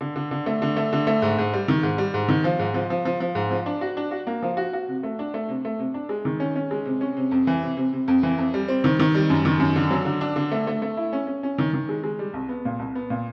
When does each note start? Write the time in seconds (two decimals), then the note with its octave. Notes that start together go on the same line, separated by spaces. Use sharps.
0.01 D3
0.16 D3
0.31 D3
0.46 A3
0.62 D3
0.76 A3
0.93 D3
1.07 A3
1.22 G#2
1.38 G#2
1.53 G3
1.68 D#3
1.83 G#2
1.98 G3
2.14 G#2
2.28 D#3
2.44 F3
2.59 G#2
2.74 F3
2.90 F3
3.05 F3
3.20 F3
3.35 G#2
3.51 F3
3.66 D4
3.81 F#4
3.97 D4
4.11 F#4
4.27 A#3
4.42 F3
4.57 F#4
4.73 F#4
4.88 C3
5.03 A3
5.19 D4
5.34 A3
5.49 C3
5.65 A3
5.79 C3
5.94 D4
6.09 G#3
6.25 D#3
6.40 C#4
6.56 C#4
6.71 G#3
6.85 C3
7.01 C#4
7.17 C3
7.31 F2
7.47 E3
7.62 C3
7.77 C3
7.93 C3
8.08 F2
8.23 E3
8.38 F2
8.54 G3
8.68 C4
8.84 D#3
8.99 D#3
9.15 G3
9.30 F#2
9.45 D#3
9.60 F#2
9.76 D3
9.91 F#3
10.05 D3
10.21 D4
10.36 D3
10.51 A3
10.67 A3
10.82 A3
10.97 E4
11.13 C#4
11.27 C#4
11.43 C#4
11.58 D#3
11.73 D#3
11.89 G#3
12.04 G#3
12.19 G3
12.34 C2
12.49 B3
12.65 A#2
12.79 C2
12.95 B3
13.10 A#2